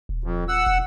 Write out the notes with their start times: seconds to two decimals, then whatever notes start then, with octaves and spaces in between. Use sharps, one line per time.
0.09 D#1
0.24 F2
0.48 F#5 E6
0.67 E1